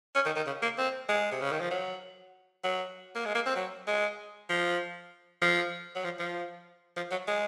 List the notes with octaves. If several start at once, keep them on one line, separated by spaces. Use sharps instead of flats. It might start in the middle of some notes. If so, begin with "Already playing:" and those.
C#4
D#3
D#3
C#3
A#3
C4
G#3
C3
C#3
D#3
F3
F#3
F#3
A#3
G#3
A#3
C4
F#3
G#3
F3
F3
F#3
F3
F3
F3
F#3
G#3